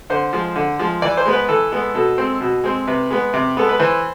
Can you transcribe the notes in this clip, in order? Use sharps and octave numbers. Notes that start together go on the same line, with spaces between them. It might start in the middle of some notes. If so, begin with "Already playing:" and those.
D3 C5
F3 G#3
D3
F3 G#3
E3 D5
C5
G#3 B3
B4
E3 A4
G#3 B3
B2 A4
G#3 C4
B2
G#3 C4
C3 B4
G#3 B3
C3
G#3 B3 A4
B4
E3 C5